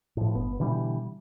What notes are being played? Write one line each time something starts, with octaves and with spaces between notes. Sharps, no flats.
A2 F3
G1 B3
B2 D3 E3 G3